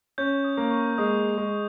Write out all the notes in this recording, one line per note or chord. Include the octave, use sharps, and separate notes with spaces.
C#4 G6
D#6
A#3
C#6
G#3 D#6
G#3